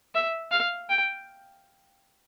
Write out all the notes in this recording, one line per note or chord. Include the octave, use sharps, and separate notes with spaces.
E5
F5
G5